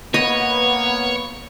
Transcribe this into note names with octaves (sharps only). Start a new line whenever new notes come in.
A#3 B3 C#5 D#5